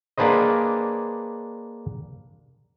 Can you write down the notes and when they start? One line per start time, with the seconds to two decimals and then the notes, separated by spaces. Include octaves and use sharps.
0.18 A#3 D4 G#4 B4 C5 D#5